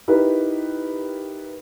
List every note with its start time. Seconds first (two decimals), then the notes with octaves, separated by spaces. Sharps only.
0.08 D#4 E4 G4 A#4 B4